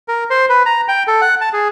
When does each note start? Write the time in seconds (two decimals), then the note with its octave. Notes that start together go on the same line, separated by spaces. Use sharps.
0.08 A#4
0.30 C5
0.49 B4
0.66 A#5
0.88 G5
1.08 A4
1.21 F#5
1.41 A5
1.53 G#4